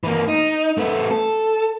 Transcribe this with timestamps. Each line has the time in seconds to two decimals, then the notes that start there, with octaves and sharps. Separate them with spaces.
0.04 E3 A#3
0.28 D#4
0.78 A3 B3
1.11 A4